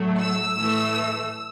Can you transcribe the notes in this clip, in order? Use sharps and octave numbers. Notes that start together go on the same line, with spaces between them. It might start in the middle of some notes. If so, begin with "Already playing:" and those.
Already playing: A2 F#3 A3
E6
A2 E3 A3